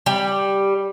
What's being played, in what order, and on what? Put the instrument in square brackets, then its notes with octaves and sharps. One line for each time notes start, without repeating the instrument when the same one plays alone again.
[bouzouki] G3